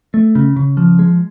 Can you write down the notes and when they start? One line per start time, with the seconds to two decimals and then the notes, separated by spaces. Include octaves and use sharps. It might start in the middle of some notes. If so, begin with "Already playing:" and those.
0.14 A3
0.35 C#3
0.56 C#3
0.77 F3
0.99 G#3